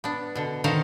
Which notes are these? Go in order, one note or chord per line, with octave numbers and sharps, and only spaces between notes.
B3 D4
B2 D3
D3 D#3 C5 D#5 F5